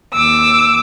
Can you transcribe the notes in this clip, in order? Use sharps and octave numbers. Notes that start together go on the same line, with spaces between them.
D#2 D6 E6